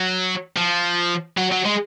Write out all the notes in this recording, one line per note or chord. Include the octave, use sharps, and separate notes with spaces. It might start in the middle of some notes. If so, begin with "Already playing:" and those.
Already playing: F#3
F3
F#3
F#3
G#3